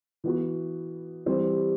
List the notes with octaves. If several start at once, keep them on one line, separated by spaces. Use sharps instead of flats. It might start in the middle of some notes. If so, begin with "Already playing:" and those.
E3 B3 F#4
E3 G3 C4